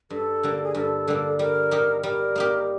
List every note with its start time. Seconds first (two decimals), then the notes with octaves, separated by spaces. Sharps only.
0.10 G2 A4
0.43 D3 G3 A#3
0.64 G#4
0.75 G2 A#4
0.81 A4
1.08 D3 G3 A#3
1.39 G3 A#4
1.71 A#3 D#4 G4
2.03 G3 A#4
2.35 A#3 D#4 G4